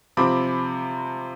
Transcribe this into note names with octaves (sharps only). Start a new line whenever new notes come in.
C3 F3 C4 B5 D6